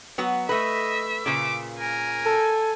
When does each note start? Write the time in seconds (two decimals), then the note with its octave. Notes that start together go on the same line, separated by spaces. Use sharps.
0.18 F#3 B3 F#4
0.49 A3 B4 D#5 E5
1.26 A#2 C#3 D6
1.78 A#4 G#5
2.26 A4